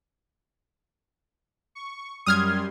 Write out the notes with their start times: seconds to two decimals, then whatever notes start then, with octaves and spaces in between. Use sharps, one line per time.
1.75 C#6
2.26 F#2 G3 C6 D#6 F6 G#6